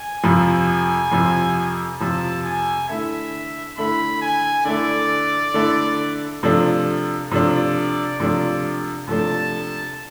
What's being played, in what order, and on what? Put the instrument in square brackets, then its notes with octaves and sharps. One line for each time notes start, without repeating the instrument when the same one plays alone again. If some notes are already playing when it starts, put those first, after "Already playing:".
Already playing: [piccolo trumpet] G#5
[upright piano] F2 C3 F3
F2 C3 F3
[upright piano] F2 C3 F3 [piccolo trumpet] A5
[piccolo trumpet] G#5
[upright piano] D3 A3 E4 A4 [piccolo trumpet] E5
[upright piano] D3 A3 E4 A4 [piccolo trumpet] B5
[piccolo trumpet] G#5
[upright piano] D3 A3 E4 A4 [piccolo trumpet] D5
[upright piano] D3 A3 E4 A4
C3 F3 A3 D4
[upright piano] C3 F3 A3 D4 [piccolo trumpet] D5
[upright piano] C3 F3 A3 D4
[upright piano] C3 F3 A3 D4 [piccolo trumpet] A5